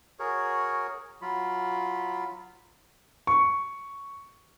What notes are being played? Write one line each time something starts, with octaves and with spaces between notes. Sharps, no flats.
F#4 G#4 A#4 C#5
F#3 F4 B5
C#6